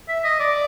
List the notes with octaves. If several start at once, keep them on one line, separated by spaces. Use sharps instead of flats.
E5
D#5
D5